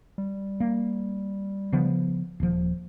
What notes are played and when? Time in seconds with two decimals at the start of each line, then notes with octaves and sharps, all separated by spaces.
0.18 G3
0.60 A#3
1.73 C#3 F3 B3
2.40 D#1 F3